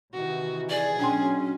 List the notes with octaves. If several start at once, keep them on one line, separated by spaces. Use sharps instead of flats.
C3 D#3 E3 F#4
G#4 D5
B2 F#3 C#4 D4 G5 C6